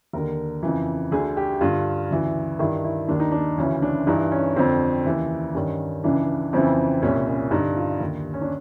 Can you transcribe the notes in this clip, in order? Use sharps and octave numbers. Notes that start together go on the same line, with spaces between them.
D#2 D3 A#4
F2 C#3 E3
D2 D3 G#4
G4
G2 D3 F4
D2 C#3 E3
G2 D#3 E4
E4
D#2 D#3 D4
D#4
D4
D2 C#3 E3 C#4
D4
G2 E3 D#4
C#4
F2 D3 C4
D#2 C#3 E3
G2 D#3 C#4
C#2 C#3 E3 D4
F2 C#3 E3 C4
C2 A#2 C#4
C#4
G2 D3 D#4
F4
D#2 D3
C#4
D4